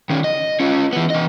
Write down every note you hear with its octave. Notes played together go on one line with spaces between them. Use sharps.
D#3 C#4
D#5
C#4 F4
E3 B3
E3 D#5